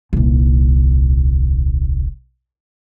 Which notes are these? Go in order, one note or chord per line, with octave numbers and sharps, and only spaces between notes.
D#1 C2